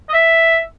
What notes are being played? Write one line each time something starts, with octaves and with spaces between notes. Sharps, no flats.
D#5
E5